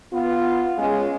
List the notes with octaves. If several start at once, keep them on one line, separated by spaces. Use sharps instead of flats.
B3 F4
G#3 C#4 F4